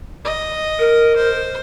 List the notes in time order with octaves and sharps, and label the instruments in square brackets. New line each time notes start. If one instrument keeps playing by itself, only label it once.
[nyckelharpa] D#5
[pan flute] A#4
[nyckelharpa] C5